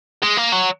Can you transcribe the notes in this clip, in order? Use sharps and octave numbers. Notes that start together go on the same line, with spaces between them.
G#3
A#3
F#3